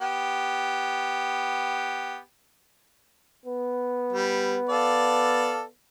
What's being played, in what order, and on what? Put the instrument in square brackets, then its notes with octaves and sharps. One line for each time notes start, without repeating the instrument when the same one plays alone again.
[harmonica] B3 G4
[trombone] B3
[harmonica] G3
A4 D5 F5